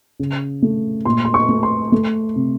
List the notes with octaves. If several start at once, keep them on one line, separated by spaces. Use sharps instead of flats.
C#3
A3
A#2 C6
C6
C#6
A3
C6
A3
C3